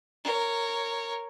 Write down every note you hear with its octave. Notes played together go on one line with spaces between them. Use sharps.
A#4 C#5